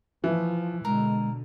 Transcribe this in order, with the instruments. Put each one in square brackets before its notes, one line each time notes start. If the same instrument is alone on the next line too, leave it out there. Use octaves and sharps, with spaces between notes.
[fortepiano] E3 [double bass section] F3
[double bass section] B2 D3 [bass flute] G#3 [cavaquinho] A#4